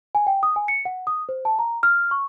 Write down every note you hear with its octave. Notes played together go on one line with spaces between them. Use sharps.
G#5
G5
D#6
G#5
C#7
F#5
D#6
C5
A5
A#5
F6
C#6